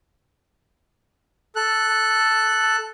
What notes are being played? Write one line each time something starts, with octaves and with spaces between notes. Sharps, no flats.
A4 F#6